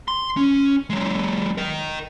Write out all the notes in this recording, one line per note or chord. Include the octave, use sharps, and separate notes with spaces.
C6
C#4
F#3 G#3
A#4 D#5